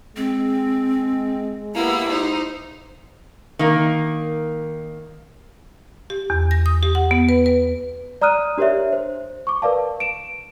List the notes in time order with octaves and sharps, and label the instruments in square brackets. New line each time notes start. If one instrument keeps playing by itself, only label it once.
[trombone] G#3 [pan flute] C4
[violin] A#3 B3 [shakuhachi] E4 [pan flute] G4
[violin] D#4 C5
[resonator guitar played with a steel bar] D#3 A#3
[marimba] G4
E2
A#6
D#6
G4
F#5
B3
B4
B4
[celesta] D5 A#5 D#6 F6 F#6 D#7
D4 G4 A#4 C#5 D5 E5
C5
C#6 D6
A#4 B4 D5 F5 A5
D7 E7